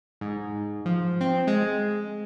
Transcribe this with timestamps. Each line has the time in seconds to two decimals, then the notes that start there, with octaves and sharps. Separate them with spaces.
0.21 G#2
0.86 F3
1.21 C4
1.47 G#3